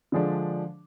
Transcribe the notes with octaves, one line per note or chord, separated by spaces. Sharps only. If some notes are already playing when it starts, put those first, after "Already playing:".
D3 F3 G#3 D4